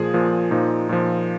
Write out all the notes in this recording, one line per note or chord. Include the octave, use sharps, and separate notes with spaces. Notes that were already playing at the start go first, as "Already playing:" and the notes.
Already playing: A#2 F3 G#4
A#2 F3
A#2 F3 D#4
A#2 F3